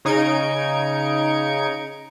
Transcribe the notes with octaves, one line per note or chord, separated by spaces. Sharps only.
C#3 D#4 G#6 C#7 D7